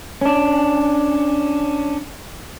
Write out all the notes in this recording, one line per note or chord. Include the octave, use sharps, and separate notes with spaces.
C#4 D4